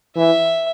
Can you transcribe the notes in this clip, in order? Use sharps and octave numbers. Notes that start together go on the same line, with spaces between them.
E3 E5